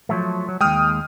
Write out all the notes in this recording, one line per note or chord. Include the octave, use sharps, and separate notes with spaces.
F3 F#3 A3
F#3
D#2 G#3 G5 D#6 F6